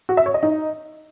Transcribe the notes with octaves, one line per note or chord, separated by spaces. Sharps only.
F#4
E5
C#5
D#5
D#4